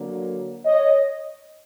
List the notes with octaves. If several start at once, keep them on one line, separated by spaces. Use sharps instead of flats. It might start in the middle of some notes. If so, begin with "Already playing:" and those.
Already playing: D3 F#3 A#3
C#5 D#5